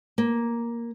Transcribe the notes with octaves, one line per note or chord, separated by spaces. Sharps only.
A#3